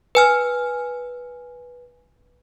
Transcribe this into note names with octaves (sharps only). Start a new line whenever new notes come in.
B4 G#5 F6